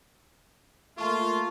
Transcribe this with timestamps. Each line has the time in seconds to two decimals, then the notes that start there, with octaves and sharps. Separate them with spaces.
0.98 A3 A#3 F4 A5 C#6